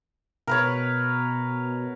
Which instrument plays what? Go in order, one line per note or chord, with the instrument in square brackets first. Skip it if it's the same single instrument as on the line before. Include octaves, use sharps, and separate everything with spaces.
[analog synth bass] B2 [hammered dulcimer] A#4 B4 C#5